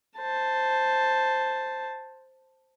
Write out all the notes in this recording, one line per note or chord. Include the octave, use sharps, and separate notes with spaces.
C5 A5